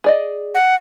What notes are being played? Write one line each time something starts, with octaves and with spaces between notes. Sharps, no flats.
G#4 D5 D#5
F#5